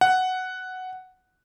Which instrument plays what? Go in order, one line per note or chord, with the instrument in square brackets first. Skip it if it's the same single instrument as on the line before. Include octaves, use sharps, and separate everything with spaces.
[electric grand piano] F#5